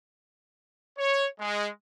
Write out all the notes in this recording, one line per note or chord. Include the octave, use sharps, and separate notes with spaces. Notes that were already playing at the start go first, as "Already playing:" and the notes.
C#5
G#3